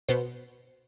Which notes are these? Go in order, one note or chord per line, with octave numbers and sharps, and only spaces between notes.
B2 B3 C5